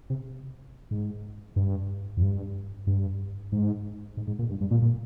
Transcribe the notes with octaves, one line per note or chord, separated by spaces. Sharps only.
C3
G#2
G2
F2
G2
G2
G#2
G#2
G#2
A#2
G2
G2
A#2
A#2